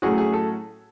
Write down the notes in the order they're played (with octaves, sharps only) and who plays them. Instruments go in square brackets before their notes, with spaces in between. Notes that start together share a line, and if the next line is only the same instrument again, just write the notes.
[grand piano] A2 F#3 A3 C#4 F#4 [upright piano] G#4
[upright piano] G#4
A4